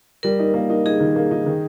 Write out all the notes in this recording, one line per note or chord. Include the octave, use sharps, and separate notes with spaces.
G3 A#4
D#4
A#3
D#4
D#4 G#4
D#3
A#3
D#4
D#3